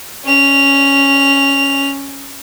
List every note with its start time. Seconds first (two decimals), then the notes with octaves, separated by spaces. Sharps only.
0.25 C#4 F7